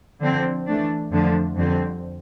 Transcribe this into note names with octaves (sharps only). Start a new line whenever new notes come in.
D3 F3 C4
E3 A3 D4
F2 D3 F3 A3 D4
F2 D3 G3 C4